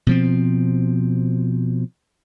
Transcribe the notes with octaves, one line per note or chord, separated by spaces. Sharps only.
B2 F3 C4